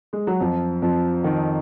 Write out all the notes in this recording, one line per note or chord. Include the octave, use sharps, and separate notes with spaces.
G#3
F#3
F2 F3
F2 F3
D#3